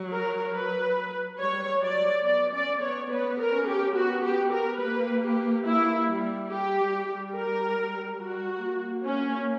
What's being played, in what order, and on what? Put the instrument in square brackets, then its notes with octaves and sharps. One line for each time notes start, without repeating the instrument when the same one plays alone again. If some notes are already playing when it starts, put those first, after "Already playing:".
Already playing: [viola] F#3
[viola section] A#4
B4
[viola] G3 [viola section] C#5
[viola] F#3 [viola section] D5
[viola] B3 [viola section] D5
[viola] C#4 [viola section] D5
[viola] B3 [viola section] C#5
[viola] B3 [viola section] B4
[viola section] A#4
[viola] C#4
[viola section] G4
[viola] B3 [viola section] F#4
[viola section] G4
A#4
[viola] A#3 [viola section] B4
[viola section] G4
[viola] A#3 [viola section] E4
[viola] G3
[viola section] G4
[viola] G3
G3
[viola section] A#4
[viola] G3 [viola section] F#4
[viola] A#3
[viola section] C#4